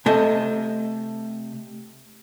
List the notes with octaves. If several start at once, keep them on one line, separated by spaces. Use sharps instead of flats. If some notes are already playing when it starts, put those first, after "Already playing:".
C3 A3 D#5 A5